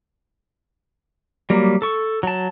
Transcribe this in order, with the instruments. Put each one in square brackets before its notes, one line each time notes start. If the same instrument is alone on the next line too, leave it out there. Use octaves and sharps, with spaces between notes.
[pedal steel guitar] F#3 G3 A#3
A4 C#6
F#3 A5